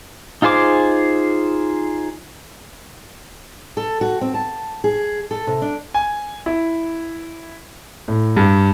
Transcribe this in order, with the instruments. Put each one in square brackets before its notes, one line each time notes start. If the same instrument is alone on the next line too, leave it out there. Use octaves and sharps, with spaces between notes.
[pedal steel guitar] D#4 F4 G#4 C5 D6
[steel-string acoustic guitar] A4
F#4
C4
A5
G#4
A4
C3
D4
[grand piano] G#5
E4
A2
G2